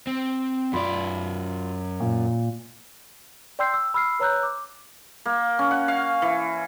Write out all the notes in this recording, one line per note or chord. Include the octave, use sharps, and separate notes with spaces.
C4
F#2 F4 D5 B5 C6
A#2
D5 G5 C6 E6 G6 C7
E6
B5 E6 F6 C7
B4 C#5 A#5 E6 F#6 G6
D6
A#3
C#4
F#5
F5
E3